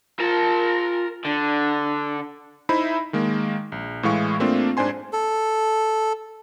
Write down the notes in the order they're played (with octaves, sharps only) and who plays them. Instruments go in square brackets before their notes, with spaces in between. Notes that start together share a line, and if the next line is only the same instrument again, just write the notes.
[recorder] F4 [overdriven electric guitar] A#4 A5
[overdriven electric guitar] D3 [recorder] D4
[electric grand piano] D#4 E4 C5 E5 B5
D#3 G#3 A#3
A#1
A2 E3 G#3 E4 F5 C#6
A3 A#3 C4 D4 F4
G#2 D4 C5 G#5 C6
[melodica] A4